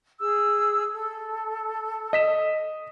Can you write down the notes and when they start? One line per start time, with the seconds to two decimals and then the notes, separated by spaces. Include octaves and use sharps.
0.20 G#4 E6
0.93 A4
2.13 D#5 B6 E7